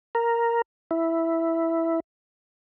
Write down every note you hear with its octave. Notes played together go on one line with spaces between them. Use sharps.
A#4
E4